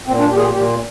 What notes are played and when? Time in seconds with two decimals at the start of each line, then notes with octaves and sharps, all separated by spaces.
0.07 A#2 C4
0.19 D4
0.30 A#2 G4
0.37 G#4
0.42 G4
0.54 A#2 G4